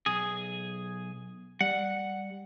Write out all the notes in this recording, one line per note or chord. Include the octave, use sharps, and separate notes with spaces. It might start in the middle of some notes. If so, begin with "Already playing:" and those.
B1 G#4
G3 F#5